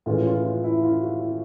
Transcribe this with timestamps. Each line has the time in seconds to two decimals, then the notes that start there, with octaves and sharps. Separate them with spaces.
0.06 A2 E3 G#3 C#4 F4
0.26 F4
0.45 F4
0.64 E4
0.83 F4
1.02 F#4
1.21 F4